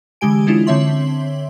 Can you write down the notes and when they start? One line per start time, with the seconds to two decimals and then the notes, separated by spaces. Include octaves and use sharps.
0.21 D3 E3 G#3 G4 G#5 D7
0.47 G#3 C#4 D4 E4 F4
0.66 D3 C4 C#5 E5 C6 F#7